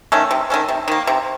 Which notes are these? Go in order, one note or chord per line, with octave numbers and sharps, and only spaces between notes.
D#3 A3 C#4
C3
D#3 A3 C#4
C3
D#3 A#3
C3